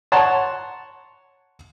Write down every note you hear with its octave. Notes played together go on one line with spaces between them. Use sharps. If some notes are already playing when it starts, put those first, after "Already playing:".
C#5 F#5 A5 A#5 C6